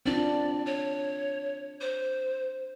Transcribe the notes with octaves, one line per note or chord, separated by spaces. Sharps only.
C4 D4 F4 D5
C#5
C5